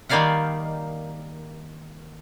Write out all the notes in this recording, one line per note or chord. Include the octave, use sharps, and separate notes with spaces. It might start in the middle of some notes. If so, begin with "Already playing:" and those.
D#3 G3 A#3 D5 F5 F#5